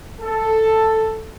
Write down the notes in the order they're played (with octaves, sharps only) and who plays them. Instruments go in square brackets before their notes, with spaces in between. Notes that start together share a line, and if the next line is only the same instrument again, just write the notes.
[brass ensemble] A4